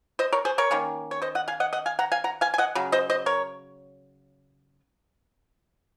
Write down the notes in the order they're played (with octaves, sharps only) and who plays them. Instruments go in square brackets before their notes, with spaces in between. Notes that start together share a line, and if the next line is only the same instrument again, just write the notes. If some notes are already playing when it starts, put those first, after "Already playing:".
[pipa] C5 D#5
A#4 C#5
G#4 C5
A#4 C#5
D#3 A#3 C#4
C#5
C5 D#5
D#5 F#5
F5 G#5
D#5 F#5
D#5 F#5
F5 G#5
F#5 A#5
F5 G#5
F#5 A#5
F5 G#5
G#5
D#5 F#5
C#3 F#3
C5 D#5
C5 D#5
A#4 C#5